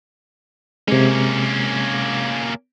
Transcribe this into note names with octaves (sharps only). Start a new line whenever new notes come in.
C3 G#3 A#3 C#4